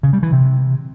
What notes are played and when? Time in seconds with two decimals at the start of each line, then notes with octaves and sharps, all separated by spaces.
0.03 C#3
0.13 G3
0.23 E3
0.32 C3